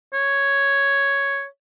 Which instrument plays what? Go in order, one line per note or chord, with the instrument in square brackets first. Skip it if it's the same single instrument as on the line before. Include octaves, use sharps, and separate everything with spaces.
[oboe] C#5